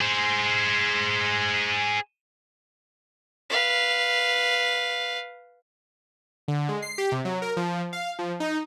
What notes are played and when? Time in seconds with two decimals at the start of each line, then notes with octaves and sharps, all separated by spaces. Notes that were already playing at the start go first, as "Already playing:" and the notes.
0.01 G#4 C5
3.50 B4 F5
6.48 D3
6.69 G#3
6.82 C7
6.98 G4
7.12 C3
7.25 F#3
7.42 A#4
7.57 F3
7.93 F5
8.19 F3
8.40 D#4